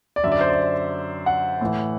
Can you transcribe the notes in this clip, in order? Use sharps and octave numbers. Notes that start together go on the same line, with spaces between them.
D5
F#2 D3 E5
D5
C5
D5
F#5
A2 E3